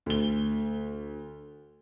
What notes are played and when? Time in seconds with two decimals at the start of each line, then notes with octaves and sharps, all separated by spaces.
0.06 D2 G7